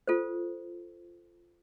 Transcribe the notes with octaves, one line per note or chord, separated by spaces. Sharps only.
F4 A4 C5